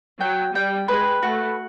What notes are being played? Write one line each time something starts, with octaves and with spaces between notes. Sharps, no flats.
F#3 G5
G3 G5
G#3 B4
A3 F#4